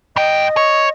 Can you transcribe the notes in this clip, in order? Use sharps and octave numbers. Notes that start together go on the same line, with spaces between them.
G#2 D#5 G5
C#5